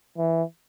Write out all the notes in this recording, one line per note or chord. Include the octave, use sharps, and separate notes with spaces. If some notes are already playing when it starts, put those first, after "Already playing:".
E3